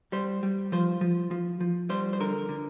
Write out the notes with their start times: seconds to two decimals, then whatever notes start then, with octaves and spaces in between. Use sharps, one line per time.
0.12 G3 C5
0.43 G3
0.72 F3 C5
1.01 F3
1.31 F3
1.61 F3
1.90 G3 C5
2.13 C5
2.20 D3 A#4
2.49 D3